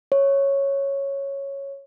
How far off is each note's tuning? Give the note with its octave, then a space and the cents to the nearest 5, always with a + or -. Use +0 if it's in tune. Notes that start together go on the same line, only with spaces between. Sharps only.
C#5 -5